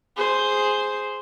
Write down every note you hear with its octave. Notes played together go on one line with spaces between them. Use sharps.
G#4 C5